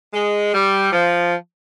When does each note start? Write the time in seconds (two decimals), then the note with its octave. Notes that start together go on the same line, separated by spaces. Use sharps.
0.13 G#3
0.53 G3
0.92 F3